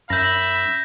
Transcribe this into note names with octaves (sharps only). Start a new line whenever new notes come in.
F#2 E5 B5 G6 A#6 E7